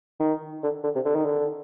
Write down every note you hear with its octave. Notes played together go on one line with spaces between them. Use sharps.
D#3
D3
D3
C3
D3
D#3
D3